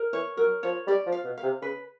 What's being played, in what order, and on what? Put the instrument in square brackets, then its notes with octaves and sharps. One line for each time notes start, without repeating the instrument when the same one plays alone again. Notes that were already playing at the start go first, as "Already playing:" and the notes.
Already playing: [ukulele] A#4
[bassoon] E3 [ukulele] C#5
[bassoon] F#3 [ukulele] A#4
[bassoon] F3 [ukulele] C#5
[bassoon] G3 [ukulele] D5
[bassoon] F3
[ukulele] F5
[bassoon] B2
[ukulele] F5
[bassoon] C3
[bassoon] C#3 [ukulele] B4